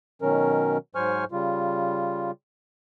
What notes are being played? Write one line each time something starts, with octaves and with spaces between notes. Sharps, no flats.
B2 D#3 F#3 C#4 A#4
G#2 F#3 C5 G#5 C#6 F6
C#3 G3 F4